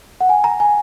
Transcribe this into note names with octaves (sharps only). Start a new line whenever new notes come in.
F#5
G#5
A#5
G#5